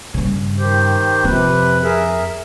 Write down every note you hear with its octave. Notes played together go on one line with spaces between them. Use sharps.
G2 C#3
D#3 G4 C5
F2 C3 C4 B4
G#4 A#4 E5